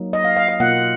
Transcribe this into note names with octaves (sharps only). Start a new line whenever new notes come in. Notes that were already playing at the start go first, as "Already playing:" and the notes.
Already playing: F#3 A#3 D#4
D#5
F5
F5
F5
B2 A#3 F4 F#5